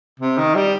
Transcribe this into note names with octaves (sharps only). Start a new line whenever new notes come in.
C3
D#3
G3